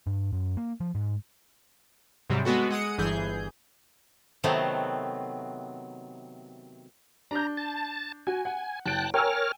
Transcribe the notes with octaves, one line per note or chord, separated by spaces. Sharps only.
G2
F#2
A#3
F3
G#2
G#2 C3 F#3 G3
G#3 B3 F#4 A4
G#3 F#5 D#6 C#7
G1 E3 G#4 G6
C3 D#3 F#3 A3 B3 C4
D4 A#5 G6
A5
F#4 G#5
F#5
F#1 G5 A5 F#6 D7
A#4 C#5 G5 G#5 E6 F6